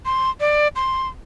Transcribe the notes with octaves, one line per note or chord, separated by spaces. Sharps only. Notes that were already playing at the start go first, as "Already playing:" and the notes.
C6
D5
C6